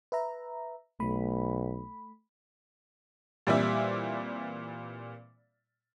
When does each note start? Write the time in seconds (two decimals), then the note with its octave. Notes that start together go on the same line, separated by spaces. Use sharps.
0.12 B4 E5 A#5
1.00 B1 A3 B5
3.47 A#2 E3 G3 C4 D5 E5